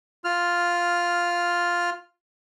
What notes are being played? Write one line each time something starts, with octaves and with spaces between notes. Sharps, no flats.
F4 F6